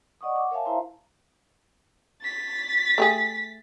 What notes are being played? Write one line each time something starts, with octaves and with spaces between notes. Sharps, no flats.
D5 D#5 F#5 C#6 D#6
F#5 D6
A#4 C#5 E5 F5 G#5 A5
E4 C5 E5 F5 A#5 C6
A6 B6
A3 G4 G#4